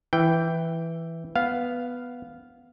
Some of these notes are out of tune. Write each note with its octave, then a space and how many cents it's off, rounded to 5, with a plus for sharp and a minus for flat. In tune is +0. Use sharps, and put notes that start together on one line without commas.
E3 +0 G5 +0
B3 +0 F5 +0